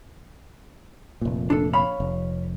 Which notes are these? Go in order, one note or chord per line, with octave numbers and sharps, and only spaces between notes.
F1 A#2
D4 A4
C#5 F5 B5
F1